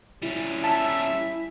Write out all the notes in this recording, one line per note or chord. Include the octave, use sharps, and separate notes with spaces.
G3 C#4 E4
E5 A5